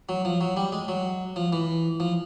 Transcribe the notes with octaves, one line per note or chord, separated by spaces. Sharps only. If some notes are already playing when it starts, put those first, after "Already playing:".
F#3
F3
F#3
G3
G#3
F#3
F3
E3
F3